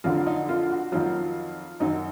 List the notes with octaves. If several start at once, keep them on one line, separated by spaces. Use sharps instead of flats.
F2 D3 F#3 F4
D#4
F4
F#4
F2 D#3 F#3 F4
F#2 D#3 F#3 D#4